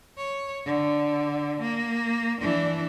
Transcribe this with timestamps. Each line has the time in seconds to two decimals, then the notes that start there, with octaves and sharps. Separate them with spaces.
0.18 C#5
0.66 D3
1.61 A#3
2.41 E3 D4